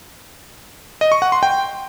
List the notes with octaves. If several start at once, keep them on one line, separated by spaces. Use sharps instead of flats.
D#5
C#6
F#5
C6
G5